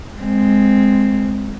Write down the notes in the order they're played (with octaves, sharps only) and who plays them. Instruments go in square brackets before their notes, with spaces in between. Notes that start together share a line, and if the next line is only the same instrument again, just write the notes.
[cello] G#3 C4